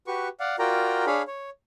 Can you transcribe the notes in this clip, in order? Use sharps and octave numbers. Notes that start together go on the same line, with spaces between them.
F#4 G4 B4 C#6
D5 F5 F#5
F4 F#4 A#4 D5 G5 A#5
D4 G#4 C#5 F5 B5
C#5